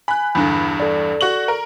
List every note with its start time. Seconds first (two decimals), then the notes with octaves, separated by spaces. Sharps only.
0.08 G#5 B5 F#6
0.35 E2 G2 D3 B5
0.80 A4 D5
1.21 F#4 C#6 F#7
1.48 A#4